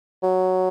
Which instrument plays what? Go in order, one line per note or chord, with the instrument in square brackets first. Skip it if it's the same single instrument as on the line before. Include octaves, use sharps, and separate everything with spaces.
[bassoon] F#3